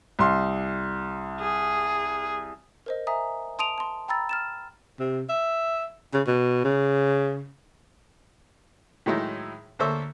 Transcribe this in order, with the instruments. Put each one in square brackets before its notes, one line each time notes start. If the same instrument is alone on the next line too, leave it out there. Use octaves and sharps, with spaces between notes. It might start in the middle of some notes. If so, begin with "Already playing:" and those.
[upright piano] C2 C6
[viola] G#4
[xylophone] A#4 C5 D#5
E5 G#5 A#5 D#6
A5 C6 D#6 D7 D#7 F7
A5 C6
G5 A#5 B5 E6 A6
F6 A6 E7
[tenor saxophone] C3
E5
C#3
B2
C#3
[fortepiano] A2 D#3 F#3 G#3 D#4 E4
D2 A#3 A4 C5 C#5 E5